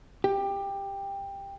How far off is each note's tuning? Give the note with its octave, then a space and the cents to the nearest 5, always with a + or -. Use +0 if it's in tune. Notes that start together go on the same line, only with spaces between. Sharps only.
G4 +15